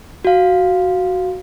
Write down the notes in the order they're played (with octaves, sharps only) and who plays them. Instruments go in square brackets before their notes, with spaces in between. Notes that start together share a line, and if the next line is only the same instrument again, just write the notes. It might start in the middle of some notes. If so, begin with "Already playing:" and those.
[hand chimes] F#4 F5